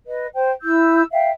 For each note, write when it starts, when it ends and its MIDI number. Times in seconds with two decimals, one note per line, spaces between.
0.06 0.26 71
0.06 0.26 75
0.33 0.50 72
0.33 0.50 79
0.62 1.02 64
0.62 1.02 88
0.62 1.02 91
1.11 1.30 76
1.11 1.30 77
1.11 1.30 79